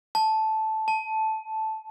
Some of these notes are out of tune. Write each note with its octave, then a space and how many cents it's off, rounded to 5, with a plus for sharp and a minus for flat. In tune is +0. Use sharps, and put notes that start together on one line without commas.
A5 -10
A5 -5